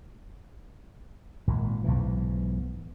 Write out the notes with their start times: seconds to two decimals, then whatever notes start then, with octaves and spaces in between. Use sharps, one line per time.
1.47 G#1 A#2
1.84 B1 G#2 E3